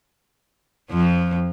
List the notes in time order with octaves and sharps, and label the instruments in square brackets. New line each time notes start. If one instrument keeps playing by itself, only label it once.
[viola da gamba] F2 F3